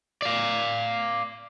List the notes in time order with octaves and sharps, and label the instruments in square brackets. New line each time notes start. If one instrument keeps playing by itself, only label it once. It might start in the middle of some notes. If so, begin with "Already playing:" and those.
[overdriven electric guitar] D5 F5